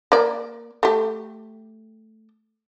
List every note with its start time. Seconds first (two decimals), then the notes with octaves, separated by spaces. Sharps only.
0.12 A#3 D5
0.83 A3 G4